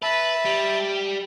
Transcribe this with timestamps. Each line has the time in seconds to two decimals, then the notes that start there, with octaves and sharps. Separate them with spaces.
0.03 B4 E5 A5 B5
0.45 G3